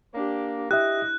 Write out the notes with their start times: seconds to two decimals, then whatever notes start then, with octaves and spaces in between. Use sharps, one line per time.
0.14 A#3 D4 G4
0.71 E4 G4 D#5 E5 F#6